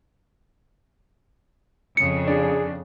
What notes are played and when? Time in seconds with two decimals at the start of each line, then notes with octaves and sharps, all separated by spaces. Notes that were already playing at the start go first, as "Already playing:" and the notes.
1.97 F2 C#3 C#7
2.28 D4 G#4